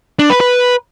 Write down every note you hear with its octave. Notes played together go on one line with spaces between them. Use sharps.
D4
B4
B4